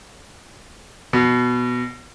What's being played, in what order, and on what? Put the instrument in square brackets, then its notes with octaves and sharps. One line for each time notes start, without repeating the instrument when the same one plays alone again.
[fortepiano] B2